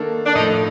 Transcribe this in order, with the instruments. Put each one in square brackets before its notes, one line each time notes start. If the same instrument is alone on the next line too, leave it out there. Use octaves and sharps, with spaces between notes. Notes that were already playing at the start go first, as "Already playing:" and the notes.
Already playing: [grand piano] D#3 A#3 D4 A4
[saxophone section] D4
[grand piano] A2 F3 A3 [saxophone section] D#4